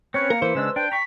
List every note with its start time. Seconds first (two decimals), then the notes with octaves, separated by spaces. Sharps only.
0.14 C4 C#4 B4 C#5 C#7
0.30 A#3 A#4
0.42 E3 B4 C5
0.55 C#3 G#3 D4 E6
0.76 D4 G5 D7
0.92 A#5 C#6 B6